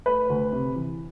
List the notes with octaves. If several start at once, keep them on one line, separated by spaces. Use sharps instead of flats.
A3 B4
D2
C3
E3